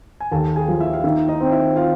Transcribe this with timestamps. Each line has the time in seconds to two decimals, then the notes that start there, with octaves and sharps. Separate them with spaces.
0.20 G#5
0.31 D#2 A4 A5
0.56 G#4 G#5
0.68 F3
0.80 E4 E5
0.94 F5
1.04 D#3 E4 E5
1.28 D#4 D#5
1.40 C4
1.52 E4 E5
1.76 F4 F5